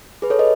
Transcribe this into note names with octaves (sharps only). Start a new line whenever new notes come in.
G#4 B4
A4 C#5
B4 D#5